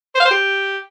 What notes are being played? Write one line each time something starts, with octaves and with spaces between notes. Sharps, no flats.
C5
F5
C5
G4